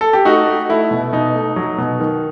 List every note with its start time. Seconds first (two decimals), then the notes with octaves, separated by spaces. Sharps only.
0.01 A4
0.13 G4
0.25 A3 D#4 F#4
0.47 A3
0.69 A3 E4
0.91 B2
1.13 B2 D#4
1.35 A3
1.56 F#3
1.78 B2
2.00 D#3